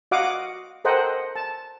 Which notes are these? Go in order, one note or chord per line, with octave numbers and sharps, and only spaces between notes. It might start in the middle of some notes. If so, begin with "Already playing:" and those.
F#4 D#5 F5 F#5 D6 D#6
A4 A#4 C5 D#5 F#5 G5
A5